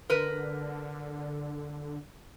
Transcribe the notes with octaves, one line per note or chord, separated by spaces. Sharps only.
D3 A#4 B4